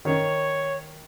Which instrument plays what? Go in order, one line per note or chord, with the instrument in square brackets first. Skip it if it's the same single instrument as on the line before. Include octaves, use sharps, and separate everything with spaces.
[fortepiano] D#3 [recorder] C#5